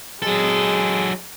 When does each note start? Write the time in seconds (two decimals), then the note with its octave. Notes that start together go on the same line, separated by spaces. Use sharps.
0.22 F#3 G#3 G#4 A4